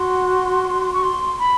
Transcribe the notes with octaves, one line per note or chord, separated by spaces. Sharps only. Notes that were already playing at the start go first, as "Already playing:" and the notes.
Already playing: F#4 C6
C#6
C6
B5